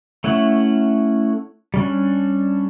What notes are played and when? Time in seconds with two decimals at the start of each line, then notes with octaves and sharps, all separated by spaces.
0.24 A3 C#4 E4 F#5
1.74 G3 C#4 D4